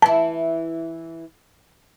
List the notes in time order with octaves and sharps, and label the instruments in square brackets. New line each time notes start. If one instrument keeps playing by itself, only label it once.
[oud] E3 E4 [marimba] A5